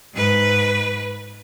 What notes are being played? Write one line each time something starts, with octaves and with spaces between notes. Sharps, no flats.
G#2 B4